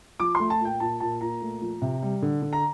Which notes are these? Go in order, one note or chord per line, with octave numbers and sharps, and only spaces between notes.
F3 D6
A3 C6
A5
A#2 G5
A#2 A5
A#2 A5
A#2 A#5
A3
F3
C3
G3
D3
D3
A#5